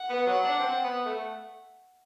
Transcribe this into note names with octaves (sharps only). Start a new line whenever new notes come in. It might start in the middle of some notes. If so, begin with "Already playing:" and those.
Already playing: F#5
B3
F#3
D4
C4
B3
A3